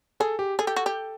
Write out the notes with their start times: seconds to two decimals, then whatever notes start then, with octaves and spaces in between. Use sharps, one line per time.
0.20 G#4 A4
0.39 G4
0.59 G#4 A4
0.67 G4
0.76 F#4
0.86 G4